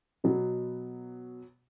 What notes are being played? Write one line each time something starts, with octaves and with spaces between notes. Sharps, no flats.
B2 F#3 B3